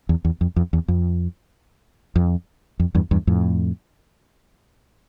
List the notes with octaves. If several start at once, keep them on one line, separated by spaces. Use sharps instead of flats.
E2
E2
F2
F2
E2
F2
F2
F2
E2 G2
E2 G2
F2 A2